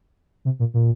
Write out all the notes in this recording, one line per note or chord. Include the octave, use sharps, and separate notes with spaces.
C3
A#2
A#2